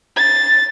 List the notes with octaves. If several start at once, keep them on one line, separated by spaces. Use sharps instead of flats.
A6